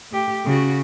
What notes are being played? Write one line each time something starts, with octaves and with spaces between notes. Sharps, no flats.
A3 G4
C#3 F#4